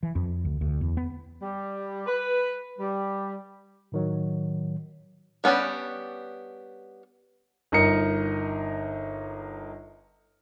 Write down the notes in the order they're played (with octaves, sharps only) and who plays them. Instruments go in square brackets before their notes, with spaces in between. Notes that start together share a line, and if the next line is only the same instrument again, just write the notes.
[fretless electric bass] E3
F2
D2
D2
E2
B3
[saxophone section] G3
B4
G3
[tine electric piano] A2 D#3 F#3
[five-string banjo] G3 B3 C#4 D4 G4
[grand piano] G1 D#4 A#4 D#5 C#7